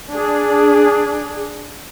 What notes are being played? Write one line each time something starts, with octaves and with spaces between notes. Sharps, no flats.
D4 G#4